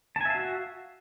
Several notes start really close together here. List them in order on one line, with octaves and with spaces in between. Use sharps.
A5 G#5 E5 F5 F#4